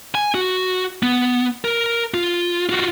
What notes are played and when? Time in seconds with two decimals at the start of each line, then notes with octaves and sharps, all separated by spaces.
0.15 G#5
0.34 F#4
1.03 B3
1.64 A#4
2.14 F4
2.69 F4 F#4